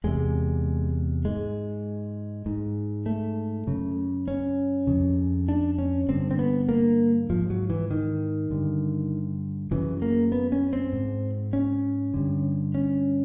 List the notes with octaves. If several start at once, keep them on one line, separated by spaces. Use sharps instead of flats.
E2 C3 G#3
G#2 G#3
G#2
A3
F#2 C#3
C#4
F2 C#3
D4
C#4
G2 D3 C4
C4
B3
A#3
G#2 F3
F#3
E3
D#3
G2 D3
F#2 C#3 E3
A#3
B3
C#4
C4
G#2
C#4
G2 D3
C#4